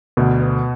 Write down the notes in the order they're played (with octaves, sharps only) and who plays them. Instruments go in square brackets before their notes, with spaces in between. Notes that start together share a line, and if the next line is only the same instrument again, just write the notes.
[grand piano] D2 [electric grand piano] B2
[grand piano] B3